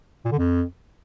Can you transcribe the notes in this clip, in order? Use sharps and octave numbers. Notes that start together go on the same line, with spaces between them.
A#2
D3
F2